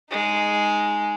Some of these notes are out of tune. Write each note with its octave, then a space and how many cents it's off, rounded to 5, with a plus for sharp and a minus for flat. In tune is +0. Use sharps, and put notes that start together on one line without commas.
G#3 +0 D#4 +0